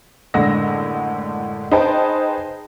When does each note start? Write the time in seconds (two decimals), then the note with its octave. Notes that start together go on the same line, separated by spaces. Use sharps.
0.34 F#1 A2 D3 G#3 E6 A#6
1.71 D#4 G#4 B4 C5 G5 A5